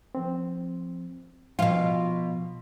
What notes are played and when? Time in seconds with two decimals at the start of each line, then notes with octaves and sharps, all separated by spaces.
0.15 F3 C4
1.59 B2 F3 F4